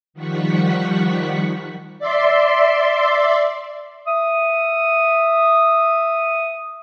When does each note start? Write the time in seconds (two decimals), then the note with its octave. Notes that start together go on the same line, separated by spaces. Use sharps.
0.14 D#3 F3 G3 F#5 C#6 B6
1.99 D5 E5 C6
4.07 E5 D#6